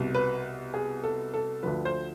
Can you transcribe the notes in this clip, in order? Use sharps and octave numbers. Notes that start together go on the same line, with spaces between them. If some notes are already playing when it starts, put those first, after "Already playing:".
Already playing: C2 B2
B4
G#4
A4
A4
D2 D3 F3 B4
C5